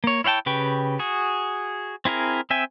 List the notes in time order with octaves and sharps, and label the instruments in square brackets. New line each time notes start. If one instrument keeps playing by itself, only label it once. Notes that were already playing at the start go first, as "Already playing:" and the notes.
[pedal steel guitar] A#3 C#5
E4 C#5 F5 G5 A5
C#3 G4 B4 G5 C#6
F#4 G#4
C4 E4 G#4 A#4
C4 E5 G5 G#5